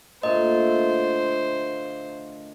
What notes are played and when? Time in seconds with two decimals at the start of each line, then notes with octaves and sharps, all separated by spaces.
0.23 A#2 D3 A3 C5 D#5